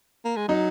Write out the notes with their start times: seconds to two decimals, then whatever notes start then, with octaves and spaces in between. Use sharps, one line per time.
0.25 A#3
0.36 G#3
0.48 F#3 D#4